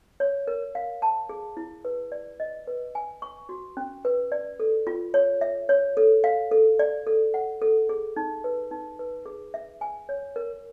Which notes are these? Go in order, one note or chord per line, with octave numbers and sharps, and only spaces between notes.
C#5
A#4
F5
A5
G#4
E4
B4
D5
D#5
B4
G#5
C#6
F#4
C#4
B4
D5
A4
F4
C#5
E5
C#5
A4
F5
A4
D5
A4
F#5
A4
G#4
D#4
B4
D#4
B4
G#4
E5
G#5
C#5
A#4